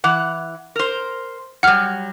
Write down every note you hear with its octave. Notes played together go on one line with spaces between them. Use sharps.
E3 F#5
A#4 C5
F#3 G3 F#5 F6